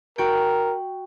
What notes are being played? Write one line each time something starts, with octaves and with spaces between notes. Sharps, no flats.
F#4 A#4 G5